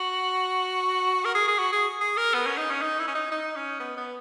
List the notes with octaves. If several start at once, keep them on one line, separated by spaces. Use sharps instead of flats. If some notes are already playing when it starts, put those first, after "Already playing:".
Already playing: F#4
A#4
G#4
G#4
F#4
G#4
G#4
A#4
B3
C#4
D#4
C#4
D#4
E4
C#4
D#4
D#4
C#4
B3
B3